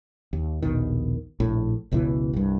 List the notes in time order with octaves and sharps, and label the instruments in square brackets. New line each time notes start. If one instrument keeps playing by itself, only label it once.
[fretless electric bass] D#2
A#1 D#2 B2 D#3
A#1 A2
F#1 C#2 B2 E3
C2 G2